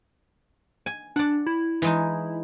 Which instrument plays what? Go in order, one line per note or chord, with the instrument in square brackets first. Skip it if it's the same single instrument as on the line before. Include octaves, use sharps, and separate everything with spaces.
[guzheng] G#5
[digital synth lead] D4 [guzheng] D5 F#5
[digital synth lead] E4
[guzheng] E3 G#3 D#4